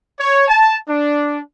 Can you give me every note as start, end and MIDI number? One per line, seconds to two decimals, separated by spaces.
0.19 0.46 73
0.48 0.77 81
0.88 1.40 62